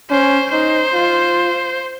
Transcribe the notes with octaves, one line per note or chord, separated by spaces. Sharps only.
C#4 C5
D#4 C5
F4